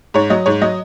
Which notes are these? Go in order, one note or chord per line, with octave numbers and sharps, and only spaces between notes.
G#2 C#5
F#3 D#5
G#2 C#5
F#3 D#5